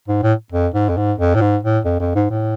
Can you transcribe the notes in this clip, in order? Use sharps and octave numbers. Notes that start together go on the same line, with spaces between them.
G#2
A2
F2
G#2
F2
G#2
F2
A2
G#2
A2
F2
F2
G#2
A2